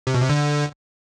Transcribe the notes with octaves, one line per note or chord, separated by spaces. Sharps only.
C3
B2
C3
D3